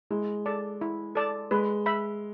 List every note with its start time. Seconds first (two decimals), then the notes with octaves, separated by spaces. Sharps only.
0.10 G#3 E4
0.46 A4 D5 A5
0.81 E4
1.15 A4 D5 A5
1.51 G#3 B4
1.86 E5 B5